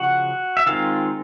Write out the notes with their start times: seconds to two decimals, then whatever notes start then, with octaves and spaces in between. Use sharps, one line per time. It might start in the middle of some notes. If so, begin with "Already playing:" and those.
Already playing: C#3 F3 F#4 F#5
0.57 E5
0.66 D#3 G#3 C4 F4 F5